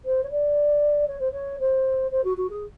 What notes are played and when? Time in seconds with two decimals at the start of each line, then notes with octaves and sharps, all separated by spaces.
0.05 C5
0.23 C#5
0.31 D5
1.08 C#5
1.20 C5
1.32 C#5
1.59 C5
2.11 C5
2.24 F#4
2.37 F#4
2.50 G#4